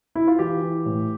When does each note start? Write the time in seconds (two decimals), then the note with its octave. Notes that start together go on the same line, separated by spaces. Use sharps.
0.15 E4
0.27 F4
0.39 E3 G4
0.62 E3
0.86 A2